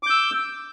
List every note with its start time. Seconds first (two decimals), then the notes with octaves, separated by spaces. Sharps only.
0.03 D6
0.06 G6
0.10 E6